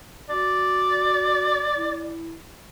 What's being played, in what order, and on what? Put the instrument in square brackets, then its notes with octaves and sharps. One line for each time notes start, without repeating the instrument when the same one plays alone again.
[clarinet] F#4 [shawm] D5
[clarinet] E4